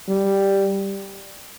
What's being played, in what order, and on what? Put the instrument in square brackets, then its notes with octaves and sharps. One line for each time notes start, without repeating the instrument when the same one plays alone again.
[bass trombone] G3